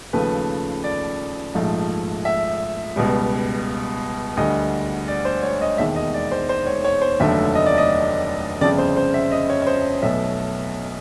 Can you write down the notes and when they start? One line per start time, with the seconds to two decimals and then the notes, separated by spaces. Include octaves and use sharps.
0.13 D#2 C#3 F3 A3 B4
0.84 D5
1.55 A#1 G#2 F3 A3
2.25 E5
2.96 C#2 B2 G3
4.37 D2 D3 G3 D#5
5.08 D5
5.25 C5
5.43 C#5
5.61 D#5
5.78 E1 D#2 D#3 G#3 E5
5.96 D#5
6.14 D5
6.31 C5
6.49 C5
6.67 C#5
6.85 C#5
7.02 C5
7.20 F1 D#2 D3 F#3 A3 E5
7.55 D#5
7.66 D5
7.78 D#5
8.61 G1 F2 C#3 D5
8.78 C5
8.97 C5
9.14 E5
9.32 D#5
9.50 C#5
9.62 C#5
9.67 C5
10.02 B1 B2 F#3 A3 E5